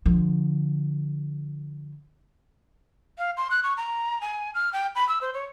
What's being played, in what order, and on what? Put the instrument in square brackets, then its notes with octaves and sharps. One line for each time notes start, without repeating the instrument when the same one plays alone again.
[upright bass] D3 F3
[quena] F5
C6
F#6
C#6
A#5
G#5
F6
G5
B5
E6
C5
C#5